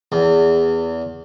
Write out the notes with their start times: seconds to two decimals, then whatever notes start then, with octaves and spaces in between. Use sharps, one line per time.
0.12 E2